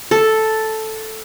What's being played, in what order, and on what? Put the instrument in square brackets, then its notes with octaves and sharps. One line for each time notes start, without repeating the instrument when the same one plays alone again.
[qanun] A4